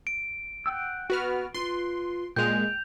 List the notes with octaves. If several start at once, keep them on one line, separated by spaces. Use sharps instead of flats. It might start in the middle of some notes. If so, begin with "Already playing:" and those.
D7
F#5 G5 E6
B3 F#4 B4 F6
F4 B4 C6
A#2 G#3 G5 G6 F7